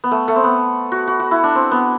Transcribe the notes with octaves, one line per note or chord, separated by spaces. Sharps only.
B3
A3
A3
C4
B3
F#4
F#4
F#4
E4
D4
C4
B3